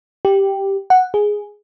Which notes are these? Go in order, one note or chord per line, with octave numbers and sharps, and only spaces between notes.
G4
F#5
G#4